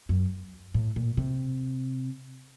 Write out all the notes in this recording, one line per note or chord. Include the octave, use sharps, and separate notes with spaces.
F#2
A2
A#2
C3